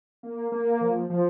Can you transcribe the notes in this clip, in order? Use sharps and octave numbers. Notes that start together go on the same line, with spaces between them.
A#3
A#3
F3
F3